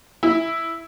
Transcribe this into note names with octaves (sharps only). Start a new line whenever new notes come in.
E4